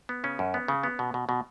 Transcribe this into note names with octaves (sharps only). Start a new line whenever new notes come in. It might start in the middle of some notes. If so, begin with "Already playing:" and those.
B3
C#3 C#4
F#2
B3
C#3
B3
B2
B2
B2